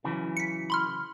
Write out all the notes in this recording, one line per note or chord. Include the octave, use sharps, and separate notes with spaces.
C#3 E3 F#3
B6 C#7
B5 C6 F6